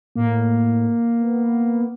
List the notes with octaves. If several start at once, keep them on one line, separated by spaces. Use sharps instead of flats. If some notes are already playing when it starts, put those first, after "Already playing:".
A2 A#3
B3